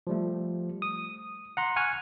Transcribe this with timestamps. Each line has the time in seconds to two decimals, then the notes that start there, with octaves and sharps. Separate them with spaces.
0.07 F3 G3 A3
0.82 D#6
1.57 F#5 A#5 C6
1.76 F#5 G#5 C#6 F6 F#6